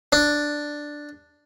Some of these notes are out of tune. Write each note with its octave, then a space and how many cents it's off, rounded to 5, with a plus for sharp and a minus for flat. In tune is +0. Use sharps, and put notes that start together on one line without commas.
D4 +5